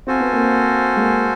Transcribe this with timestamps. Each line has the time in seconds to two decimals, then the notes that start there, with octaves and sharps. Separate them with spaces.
0.07 C4 F#4 A4 C5 F5 G#5
0.20 B3
0.33 A#3 C4
0.97 G#3 A#3